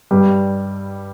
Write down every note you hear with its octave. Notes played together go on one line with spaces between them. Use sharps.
G2 G3